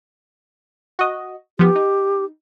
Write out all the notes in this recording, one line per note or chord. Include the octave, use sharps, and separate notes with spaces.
F#4 D#5
F3 B3 G4
D#4